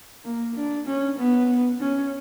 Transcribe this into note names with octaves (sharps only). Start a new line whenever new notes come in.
A#3
D4
C#4
B3
C#4